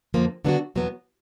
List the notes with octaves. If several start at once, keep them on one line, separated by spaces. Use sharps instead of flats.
F2 D3 F3 A#3
D3 F#3 B3 D4 F#4
E2 B2 F#3 B3